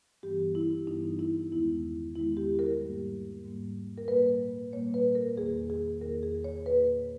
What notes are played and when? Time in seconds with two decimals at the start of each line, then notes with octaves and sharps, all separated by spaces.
0.23 G2 E3 G3 B3 G4
0.55 E4
0.87 G2 E3 G3 B3 D#4
1.19 E4
1.52 E2 D#3 G#3 B3 E4
2.16 E2 D#3 G#3 B3 E4
2.37 G4
2.59 A#4
2.81 G#2 G3 A#3
3.45 G#2 G3 A#3
3.98 A#4
4.08 A#2 G3 A#3 B4
4.73 A#2 G3 A#3 C#5
4.94 B4
5.15 A#4
5.37 E2 D#3 A#3 G#4
5.70 G#4
6.01 E2 D#3 A#3 A#4
6.23 G#4
6.44 C#5
6.66 A#2 A#3 B4